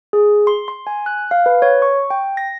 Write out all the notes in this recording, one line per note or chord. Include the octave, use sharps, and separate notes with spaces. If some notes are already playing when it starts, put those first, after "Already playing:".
G#4
C6
C6
G#5
F#6
F5
B4
C#5
C#6
G5
A#6